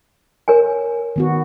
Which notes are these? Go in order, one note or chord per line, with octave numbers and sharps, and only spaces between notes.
A#4 C#5 G#5
D#3 B3 F#4